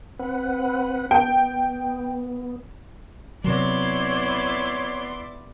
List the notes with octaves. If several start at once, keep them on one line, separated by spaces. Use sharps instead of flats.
C4 B4 F#5
B3 G5
C3 F#3 B3 E4 C#5 D5 C6